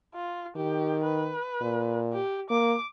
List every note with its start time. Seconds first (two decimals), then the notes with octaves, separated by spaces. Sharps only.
0.15 F4
0.56 D#3 G4
1.04 B4
1.61 A#2
2.13 G4
2.50 A#3 D6